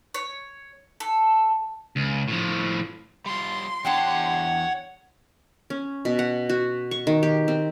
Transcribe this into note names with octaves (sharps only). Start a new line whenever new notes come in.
C#5
A4
C#2
A2 F3
G3 F4 C6
E2 D4 F#4 G4 C#5 F#5 A5
C#4
B2
F#5
F#4
C#6
D#3
G4
C4